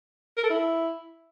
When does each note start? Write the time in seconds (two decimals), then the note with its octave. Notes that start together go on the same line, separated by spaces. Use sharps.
0.37 A#4
0.44 A4
0.50 E4